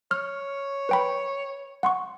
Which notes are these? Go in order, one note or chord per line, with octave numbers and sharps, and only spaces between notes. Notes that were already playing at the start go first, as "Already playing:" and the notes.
C#5 F6
B4 G5 B5
F#5 C6 C#6